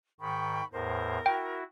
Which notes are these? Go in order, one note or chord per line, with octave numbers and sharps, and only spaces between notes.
G#2 D#3 G5 B5 C#6
E2 A2 A#4 C5
E4 F#4 G5